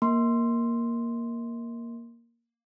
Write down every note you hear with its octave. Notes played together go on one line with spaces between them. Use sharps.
A#3 C6